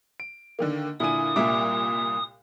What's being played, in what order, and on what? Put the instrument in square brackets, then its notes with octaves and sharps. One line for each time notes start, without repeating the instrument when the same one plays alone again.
[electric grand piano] D7
[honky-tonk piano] D3 D#3 A#3
[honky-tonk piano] A#2 D3 D#7 [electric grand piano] E4 G#5 [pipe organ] D#6
[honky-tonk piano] C2 A#2 [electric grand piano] A#3 E5 D6